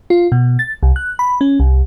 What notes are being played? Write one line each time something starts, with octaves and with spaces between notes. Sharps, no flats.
F4
B2
A6
C2
F#6
B5
C#4
C2